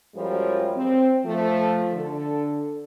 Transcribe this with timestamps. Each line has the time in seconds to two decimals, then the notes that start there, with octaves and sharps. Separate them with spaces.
0.15 F#2 F3 G3 G#3 A#4 C#5
0.76 C4
1.25 F3 A3
1.93 D3 A4